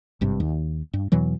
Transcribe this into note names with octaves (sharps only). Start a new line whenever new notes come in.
G#1 G2 C3
D#2
G2
E2 B2 E3 F#3